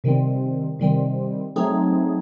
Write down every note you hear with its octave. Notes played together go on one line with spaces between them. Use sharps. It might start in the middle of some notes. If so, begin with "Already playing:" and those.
C3 D#3 G3 C4
C3 D#3 G3 C4
F#3 A3 C4 D#4 G#4